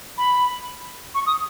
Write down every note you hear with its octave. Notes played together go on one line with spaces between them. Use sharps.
B5
C#6
D#6